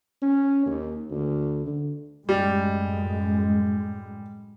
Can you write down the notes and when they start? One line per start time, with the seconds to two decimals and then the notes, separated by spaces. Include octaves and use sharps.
0.22 C#4
0.66 D#2
1.11 D2
1.66 D3
2.29 F#2 A2 G3 G#3